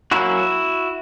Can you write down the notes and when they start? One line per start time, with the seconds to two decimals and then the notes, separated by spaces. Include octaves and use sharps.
0.11 F#3 A#3 C#4 E4 F#4